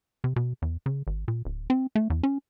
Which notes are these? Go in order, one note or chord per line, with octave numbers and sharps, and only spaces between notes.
C3
B2
E2
C#3
G#1
A#2
D1
C4
A3
E2
C#4